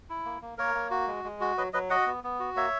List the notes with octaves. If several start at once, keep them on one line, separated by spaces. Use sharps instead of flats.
E4
A#3
A#3
A#3 A#4 C#5
A#3
F#4
G#3
G#3
F#4
F#3 B4 D#5
F#3 B4 D#5
F#4 D#5 F#5
B3
B3
F#4
A#3 C#5 E5